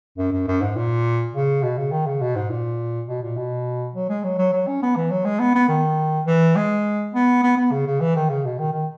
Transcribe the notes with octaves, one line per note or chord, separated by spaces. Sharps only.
F#2
F#2
F#2
G#2
A#2
C#3
B2
C#3
D#3
C#3
B2
G#2
A#2
B2
A#2
B2
F#3
G#3
F#3
F#3
F#3
C#4
B3
E3
F#3
G#3
B3
B3
D#3
E3
G#3
B3
B3
B3
C#3
C#3
E3
D#3
C#3
B2
D#3
D#3